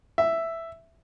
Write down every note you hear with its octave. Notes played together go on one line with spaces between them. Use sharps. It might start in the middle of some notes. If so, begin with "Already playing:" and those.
E5